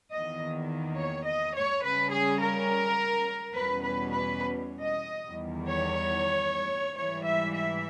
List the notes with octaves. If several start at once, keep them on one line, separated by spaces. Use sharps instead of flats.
E2 D#3 A#3 D#5
C#5
D#5
C#5
C#3 G3 C#4 B4
G#4
A#4
E2 B2 G3 C#4 B4
B4
B4
D#5
E2 D#3 G3
C#5
G#2 E3 G3 C#5
E5
E5